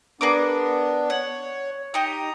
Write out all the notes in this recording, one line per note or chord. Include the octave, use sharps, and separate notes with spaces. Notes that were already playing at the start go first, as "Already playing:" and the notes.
B3 D4 G#4 A#4 D6
C#5 F#5
D#4 G4 A#5 D#6